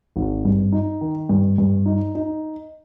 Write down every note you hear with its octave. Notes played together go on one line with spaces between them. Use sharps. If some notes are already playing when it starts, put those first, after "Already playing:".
G#1
G2
D#4
D#3
G2
G2
D#4
D#4